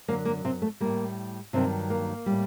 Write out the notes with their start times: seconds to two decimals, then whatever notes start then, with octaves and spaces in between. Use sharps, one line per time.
0.08 F#2 D3 F#3 A#3
0.25 A#3
0.45 C3 C4
0.62 A3
0.80 A2 G3 A#3
1.53 G2 C3 D#3 F#3 C4
1.90 A#3
2.26 A2 G3